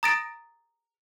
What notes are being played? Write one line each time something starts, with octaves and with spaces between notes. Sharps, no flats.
A#5 D#6 A6 A#6 D7